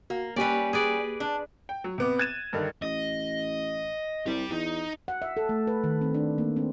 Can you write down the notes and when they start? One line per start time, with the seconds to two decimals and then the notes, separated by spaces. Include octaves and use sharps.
0.10 A#3 F#4
0.36 G3 A#3 C#4 G4 B4 D5
0.73 G#4 B4 D5
1.20 D4
1.69 G5
1.84 F#3
1.98 C3 B3 D6
2.19 F#6 G#6 A6 D#7 E7
2.53 G2 D3 D#3
2.82 A1 D#5
4.26 C2 G4 D5
4.51 E2 D#4
5.08 F#5
5.22 E5
5.37 A4
5.49 A3
5.67 B4
5.84 D#3
6.01 C4
6.14 D4
6.38 A#3
6.56 C4